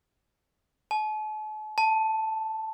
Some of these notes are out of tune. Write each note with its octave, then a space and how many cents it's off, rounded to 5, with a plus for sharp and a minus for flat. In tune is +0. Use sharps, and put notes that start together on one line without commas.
A5 -45
A5 +0